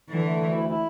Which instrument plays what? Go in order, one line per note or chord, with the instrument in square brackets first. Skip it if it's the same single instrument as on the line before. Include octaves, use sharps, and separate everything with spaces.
[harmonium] D3 [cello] E3
[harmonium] A3
D2
E4
E4